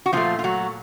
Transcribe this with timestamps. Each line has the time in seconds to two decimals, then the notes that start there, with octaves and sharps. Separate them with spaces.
0.06 F#4
0.13 A#2 F3 A3 F4
0.39 F4
0.44 F#3 F#4